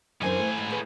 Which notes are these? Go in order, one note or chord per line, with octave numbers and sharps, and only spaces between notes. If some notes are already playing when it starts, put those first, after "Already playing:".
F#2 A2 D3 E3 C4 C5 G#5
A3
G#2
G#4 B4